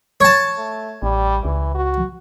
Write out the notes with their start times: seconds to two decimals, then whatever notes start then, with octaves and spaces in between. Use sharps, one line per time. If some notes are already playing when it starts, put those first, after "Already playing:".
0.20 C#5 A5
0.58 A3
1.02 A1 G3
1.45 C#2 E3
1.75 F#4